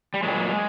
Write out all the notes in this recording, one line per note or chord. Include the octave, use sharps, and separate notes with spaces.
G3
A#2 F#3 G#3